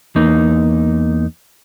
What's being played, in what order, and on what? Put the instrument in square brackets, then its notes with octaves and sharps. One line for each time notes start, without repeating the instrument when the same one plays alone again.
[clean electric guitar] E2 A#3 D#4